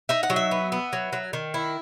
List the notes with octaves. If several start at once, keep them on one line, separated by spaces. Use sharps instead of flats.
D#4 E5
F#5
F#3
E5
B3
B3
F#3
F#3
D#3
E4